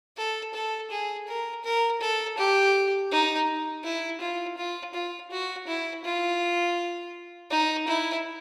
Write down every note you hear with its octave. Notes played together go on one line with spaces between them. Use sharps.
A4
A4
G#4
A#4
A#4
A4
G4
D#4
E4
F4
F4
F4
F#4
E4
F4
D#4
E4